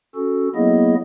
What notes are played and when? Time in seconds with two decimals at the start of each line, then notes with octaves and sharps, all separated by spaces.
0.15 C#4 F#4 A4
0.55 F#3 A#3 B3 E4 G#4 D#5